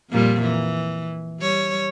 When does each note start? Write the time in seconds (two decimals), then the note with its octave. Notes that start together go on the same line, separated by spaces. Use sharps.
0.10 F2 A#2 G3
0.42 E3
1.40 G3 C#5